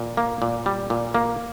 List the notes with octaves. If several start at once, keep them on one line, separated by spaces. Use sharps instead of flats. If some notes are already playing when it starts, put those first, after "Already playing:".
Already playing: A#2
A#3
A#2
G3
A#2
A#3